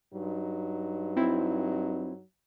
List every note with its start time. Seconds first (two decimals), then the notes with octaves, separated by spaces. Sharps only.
0.14 G2 F#3 D#4
1.16 C4 E4